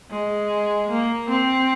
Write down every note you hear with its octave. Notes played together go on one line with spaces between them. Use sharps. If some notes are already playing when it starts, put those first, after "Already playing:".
G#3
A#3
C4